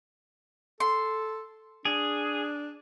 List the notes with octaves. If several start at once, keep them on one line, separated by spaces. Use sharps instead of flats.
A4 C6
D4 G#4